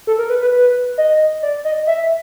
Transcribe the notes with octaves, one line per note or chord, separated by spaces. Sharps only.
A4
A#4
B4
B4
B4
D#5
D5
D#5
E5